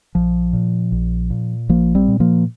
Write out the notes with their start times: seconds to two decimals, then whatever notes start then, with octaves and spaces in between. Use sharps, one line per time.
0.15 A#1 F3
0.53 A#2
0.92 A#1
1.30 A#2
1.69 A#1 F3 A#3
1.95 G3 C4
2.08 A#2
2.20 F3 A#3